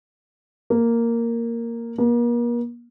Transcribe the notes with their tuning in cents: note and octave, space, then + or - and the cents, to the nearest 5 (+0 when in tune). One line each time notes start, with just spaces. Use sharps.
A#3 -5
A#3 +40